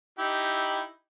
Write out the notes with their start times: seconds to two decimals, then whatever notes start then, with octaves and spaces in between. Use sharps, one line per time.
0.18 D#4 E4 G4